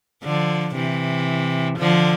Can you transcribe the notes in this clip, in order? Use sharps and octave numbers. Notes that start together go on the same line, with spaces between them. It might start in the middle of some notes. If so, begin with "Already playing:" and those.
D3 F3
C3 E3
D3 F3